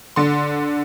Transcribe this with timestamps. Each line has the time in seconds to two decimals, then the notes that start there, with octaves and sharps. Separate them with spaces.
0.16 D3 C6